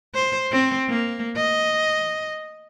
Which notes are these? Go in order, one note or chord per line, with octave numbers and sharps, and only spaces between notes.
C5
C4
A#3
D#5